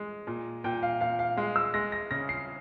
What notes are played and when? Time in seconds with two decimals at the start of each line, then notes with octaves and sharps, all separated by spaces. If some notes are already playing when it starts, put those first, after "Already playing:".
Already playing: G#3
0.27 A#2
0.64 A#2 G5
0.83 F5
1.01 A#2 F5
1.19 F5
1.37 G#3 F5
1.56 E6
1.74 G#3 A#6
1.92 A#6
2.11 C#3 A#6
2.29 C7